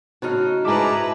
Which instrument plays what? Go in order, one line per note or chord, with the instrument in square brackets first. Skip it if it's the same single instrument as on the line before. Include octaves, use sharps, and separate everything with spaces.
[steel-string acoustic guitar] A2 C#3 D#4 [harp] F#4 F6
[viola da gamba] G#2 E4 B4 [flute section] G#4 A5 A#5 [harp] E5 D6